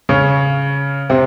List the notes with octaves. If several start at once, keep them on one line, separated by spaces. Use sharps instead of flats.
C#3 C#4
C3 C4